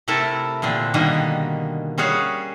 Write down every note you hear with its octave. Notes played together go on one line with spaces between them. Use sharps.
C3 A3 E4 A4 A#4 A5
A#2 D3 C4 D4
B2 D3 D#3 G3 A#3
G3 C#4 F#4 G#4 C#5 F5